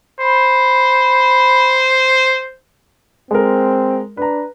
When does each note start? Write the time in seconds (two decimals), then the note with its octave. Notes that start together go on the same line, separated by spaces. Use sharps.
0.21 C5 B5
3.31 G#3 C4 A#4
4.17 D4 B4 A#5